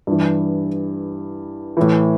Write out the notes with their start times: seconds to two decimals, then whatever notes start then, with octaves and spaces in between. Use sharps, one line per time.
0.07 G2 E3
1.77 A2 E3